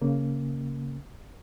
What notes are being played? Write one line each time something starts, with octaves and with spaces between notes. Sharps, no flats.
C#3 A#3